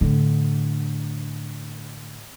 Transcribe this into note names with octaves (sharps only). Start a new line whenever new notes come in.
A2 D3